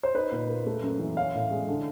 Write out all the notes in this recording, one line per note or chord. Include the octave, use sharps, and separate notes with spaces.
C5
D#4 B4
A#2
A#3
A3
F#2
E3
C#4 F5
A2
G#3
D3